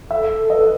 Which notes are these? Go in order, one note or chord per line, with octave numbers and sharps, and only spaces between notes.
A4 E5
A4
B4 D#5